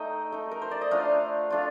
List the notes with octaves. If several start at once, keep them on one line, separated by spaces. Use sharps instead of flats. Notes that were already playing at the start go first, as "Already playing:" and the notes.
Already playing: A3 D#4 D#5 G5
A3 D#4
A#4
C5
D5
D#5
A3 D4 F4 F5
A3 D4 F4